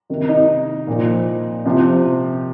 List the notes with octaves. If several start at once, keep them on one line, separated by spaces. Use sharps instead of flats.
C3 D#3
D#4
A#2 F3
C3 F3